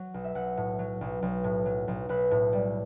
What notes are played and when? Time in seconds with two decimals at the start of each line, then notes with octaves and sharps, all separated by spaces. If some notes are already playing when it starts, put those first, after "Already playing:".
Already playing: F#3
0.14 B1
0.24 E5
0.35 B1 F#5
0.57 A2
0.79 F#3
1.01 B1
1.22 B1
1.44 A2
1.66 F#3
1.88 B1
2.09 B1 B4
2.31 A2
2.53 G3